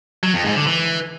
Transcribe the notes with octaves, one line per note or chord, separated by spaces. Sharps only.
F#3
F2
G#2
D3
E3